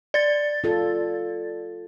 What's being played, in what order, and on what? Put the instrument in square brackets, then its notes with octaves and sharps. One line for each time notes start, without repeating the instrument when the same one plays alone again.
[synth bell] D5 A6
[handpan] F4 A4